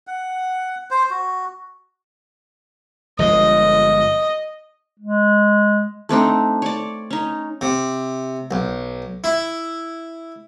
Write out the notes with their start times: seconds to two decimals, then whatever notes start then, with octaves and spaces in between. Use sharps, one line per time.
0.07 F#5
0.91 C5
1.10 F#4
3.19 G1 F3 G#3 D#5
4.99 G#3
6.09 A3 C4 D4 D#4
6.62 C#5 D5
7.11 C#4 D#4
7.61 C3
8.51 B1
9.24 E4